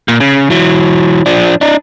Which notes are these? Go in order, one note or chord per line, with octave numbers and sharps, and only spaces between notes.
A#2
C#3
E3 F#3
F3 D4
D4 D#4